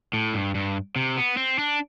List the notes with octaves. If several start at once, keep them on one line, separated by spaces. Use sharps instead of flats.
A2
G2
G2
C3
B3
C4
D4